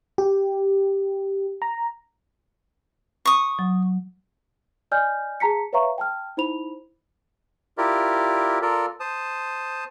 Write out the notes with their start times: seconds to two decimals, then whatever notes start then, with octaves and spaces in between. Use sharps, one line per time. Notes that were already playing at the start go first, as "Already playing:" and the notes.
0.18 G4
1.62 A#5
3.25 C#6 D#6
3.59 F#3
4.92 D5 D#5 G#5 F6 G6
5.40 G#4 A5 A#5 B6 C#7
5.73 B4 C#5 E5 F5 A#5 C#6
5.98 G5 A5 F6
6.37 D#4 E4 C5 B5 F7
7.78 E4 F4 G4 A#4 D5
8.62 F4 A4 A#4 D5
9.00 C5 A5 D#6